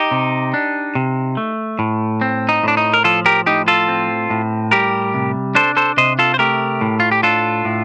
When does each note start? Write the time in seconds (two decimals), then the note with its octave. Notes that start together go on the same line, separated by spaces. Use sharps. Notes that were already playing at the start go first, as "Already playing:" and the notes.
Already playing: D#4 G4
0.11 C3
0.54 D4
0.95 C3
1.37 A3
1.79 A2
2.21 C4
2.49 D#4
2.63 A2 D4
2.77 D#4
2.94 A#4
3.04 F3 F4 A4
3.26 G4 A#4
3.46 A2 D#4 G4
3.68 F4 A4
3.88 C4
4.30 A2
4.71 G3 G4 A#4
5.14 C3
5.55 D4 A4 C5
5.77 A4 C5
5.97 C3 C5 D#5
6.19 F4 A4
6.34 C5
6.39 A3 G4 A#4
6.81 A2
7.00 F4
7.12 G4
7.23 D4 F4 A4
7.65 A2